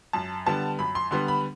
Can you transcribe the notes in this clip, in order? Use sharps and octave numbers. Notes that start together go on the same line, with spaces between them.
F#2 A5
D3 G3 B3 A5
F#2 B5
C6
D3 G3 B3 C6
B5